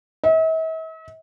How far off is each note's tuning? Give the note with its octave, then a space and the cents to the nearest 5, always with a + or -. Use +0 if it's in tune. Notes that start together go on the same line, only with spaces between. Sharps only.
E5 -45